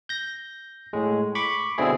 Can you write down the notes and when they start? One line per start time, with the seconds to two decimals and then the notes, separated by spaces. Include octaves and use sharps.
0.09 G6 A#6
0.93 A2 G#3
1.35 B5 C#6 D6
1.78 B2 D3 C4 E4 G#4